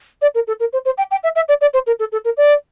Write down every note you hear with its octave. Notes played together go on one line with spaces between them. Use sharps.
D5
A#4
A4
A#4
C5
C5
G5
G5
E5
E5
D5
D5
C5
A#4
A4
A4
A#4
D5